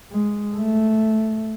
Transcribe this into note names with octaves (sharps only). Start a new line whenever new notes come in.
G#3
A3